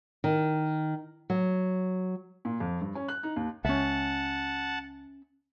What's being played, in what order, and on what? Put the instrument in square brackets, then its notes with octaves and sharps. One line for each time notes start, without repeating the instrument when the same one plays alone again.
[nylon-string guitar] D#3
F#3
[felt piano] A#2
F2
G2
C#4
F#6
D#4
D#2
[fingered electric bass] C#2 [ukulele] C#4 E5 [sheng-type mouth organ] F#5 A5